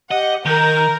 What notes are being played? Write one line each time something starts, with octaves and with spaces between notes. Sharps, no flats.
G4 D#5 F#5
D#3 A#4 G6